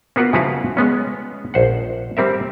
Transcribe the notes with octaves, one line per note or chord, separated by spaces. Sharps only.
A#3 B3 F4 F#4 A#4 B4
C#3 F3 E4 F#4 B4 F5
G#3 B3 C#4
A#1 C5 F#5
G3 C4 A#4 E5